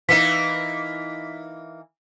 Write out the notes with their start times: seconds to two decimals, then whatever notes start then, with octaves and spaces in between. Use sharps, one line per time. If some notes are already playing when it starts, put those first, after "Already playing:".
0.09 E3 A#3 D#4 B6